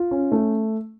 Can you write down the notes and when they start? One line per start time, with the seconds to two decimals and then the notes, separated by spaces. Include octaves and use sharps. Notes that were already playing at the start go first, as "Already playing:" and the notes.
Already playing: F4
0.11 C#4
0.32 A3